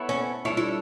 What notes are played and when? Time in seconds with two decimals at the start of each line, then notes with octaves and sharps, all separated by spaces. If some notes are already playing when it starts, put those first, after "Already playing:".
Already playing: B3 E4 A4 C#5
0.09 C#4
0.45 G3 D4 E4 A4 C#5
0.57 E4